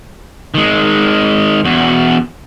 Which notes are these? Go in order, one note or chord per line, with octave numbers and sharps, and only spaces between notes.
D#3 G#3
E2 F#4